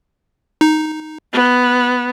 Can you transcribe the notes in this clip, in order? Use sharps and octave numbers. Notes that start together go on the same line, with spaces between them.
D#4
B3